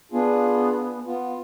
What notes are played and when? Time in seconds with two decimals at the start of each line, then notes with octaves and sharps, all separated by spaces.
0.12 B3 D4 F4 G#4
1.06 B3 F4